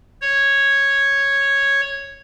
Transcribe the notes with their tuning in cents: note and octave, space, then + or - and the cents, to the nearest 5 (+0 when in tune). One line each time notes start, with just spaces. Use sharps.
C#5 -5